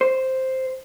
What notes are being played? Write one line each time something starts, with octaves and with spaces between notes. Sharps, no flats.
C5